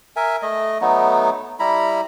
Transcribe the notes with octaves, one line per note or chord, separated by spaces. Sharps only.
A#4 E5 G#5
A3 D#5
F#3 A3 B3 D#4
G3 E4 A#5 B5